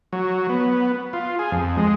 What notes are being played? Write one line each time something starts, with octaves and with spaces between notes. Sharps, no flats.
F#3
B3
F4
G#4
F2
G#3